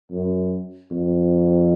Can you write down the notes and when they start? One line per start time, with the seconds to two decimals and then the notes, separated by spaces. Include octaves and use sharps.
0.11 F#2
0.91 F2